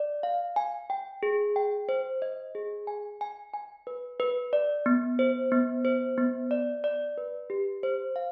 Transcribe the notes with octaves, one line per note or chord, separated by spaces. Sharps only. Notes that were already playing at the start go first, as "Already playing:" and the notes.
Already playing: D5
F5
G#5
G5
G#4
G5
C5
D#5
G#4
G#5
G#5
G#5
B4
B4
D5
B3
C5
B3
C5
B3
D5
D5
B4
G4
C5
F5